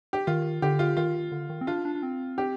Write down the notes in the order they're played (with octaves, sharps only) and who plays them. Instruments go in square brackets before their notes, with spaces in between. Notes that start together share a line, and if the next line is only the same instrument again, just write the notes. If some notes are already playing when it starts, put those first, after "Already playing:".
[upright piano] G4
[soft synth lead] D#3 [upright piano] F4
[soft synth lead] D3 [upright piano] G4
[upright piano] F4
[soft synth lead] D#3 [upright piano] F4
[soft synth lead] D3
D#3
C4
[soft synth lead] D4 [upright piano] F4
[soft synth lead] D4
D4
C4
[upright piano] G4